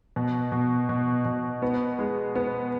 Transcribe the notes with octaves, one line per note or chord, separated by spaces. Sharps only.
B2
B2
B2
B2
B3
G#3
B3